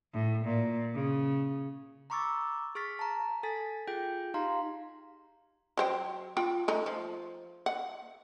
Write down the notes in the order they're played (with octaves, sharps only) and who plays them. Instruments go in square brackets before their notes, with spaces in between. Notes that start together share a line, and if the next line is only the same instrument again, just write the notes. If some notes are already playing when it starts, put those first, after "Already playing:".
[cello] A2
A#2
C#3
[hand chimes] A#5 B5 C#6 D6 E6 A6
G#4 C#6 F6 A6 B6
A5 A#5
A4 G#5 A6 B6
F4 G#4 G5 G6
D#4 G4 F5 A#5 C6
[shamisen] F#3 C5 G5
F4 G5
A3 D#4
F3
F#5